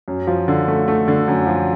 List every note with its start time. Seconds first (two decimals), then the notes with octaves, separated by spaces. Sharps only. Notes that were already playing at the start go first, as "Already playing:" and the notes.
0.08 F#2
0.27 F3
0.48 D3
0.68 A3
0.88 A3
1.08 D3
1.28 F#2
1.47 F3